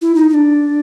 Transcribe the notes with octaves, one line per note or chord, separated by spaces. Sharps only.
E4
D#4
D#4
D4